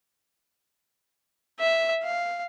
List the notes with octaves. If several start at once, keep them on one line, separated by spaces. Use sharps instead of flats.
E5
F5